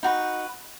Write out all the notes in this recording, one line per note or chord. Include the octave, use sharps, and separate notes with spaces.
D#4 F#4 B4